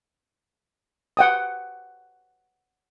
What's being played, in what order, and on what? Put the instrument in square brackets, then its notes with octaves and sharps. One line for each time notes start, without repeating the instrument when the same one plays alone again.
[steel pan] F#5 G5 D#6